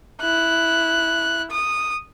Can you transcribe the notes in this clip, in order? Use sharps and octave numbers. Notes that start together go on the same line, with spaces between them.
E4 F#6
D#6